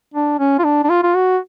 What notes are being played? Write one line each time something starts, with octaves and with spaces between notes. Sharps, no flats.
D4
C#4
F4
D4
D4
F4
F4
F#4